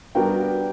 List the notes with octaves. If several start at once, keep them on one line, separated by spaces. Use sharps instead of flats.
G3 B3 D4 F#4 A#4 G5